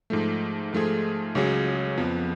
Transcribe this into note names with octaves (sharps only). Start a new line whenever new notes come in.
G#2 F3 A3
G#2 F3 A3 F4 G#4
C#2 C#3 F#3 C#4 G#4
F2 F3 B3